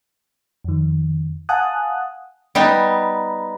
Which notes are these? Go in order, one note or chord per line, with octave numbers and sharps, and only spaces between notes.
F2 D#3
F5 F#5 G#5 A5 D#6 F#6
G3 B3 D#4